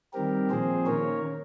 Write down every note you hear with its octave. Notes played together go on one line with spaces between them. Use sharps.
D#3 G3 C4 G4 A#4
A#2 F3 C4 G#4 C5
D#3 A#3 C#4 A#4 C#5